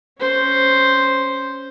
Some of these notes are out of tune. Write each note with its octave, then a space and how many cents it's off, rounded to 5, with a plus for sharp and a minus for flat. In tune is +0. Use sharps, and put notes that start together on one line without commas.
C#4 +0 C5 +0